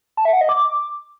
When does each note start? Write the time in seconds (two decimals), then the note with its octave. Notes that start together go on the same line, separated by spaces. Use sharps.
0.17 A5
0.25 E5
0.33 F#5
0.41 D#5
0.49 D6